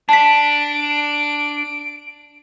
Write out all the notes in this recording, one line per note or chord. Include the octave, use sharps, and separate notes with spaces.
D4 A5 B6 D7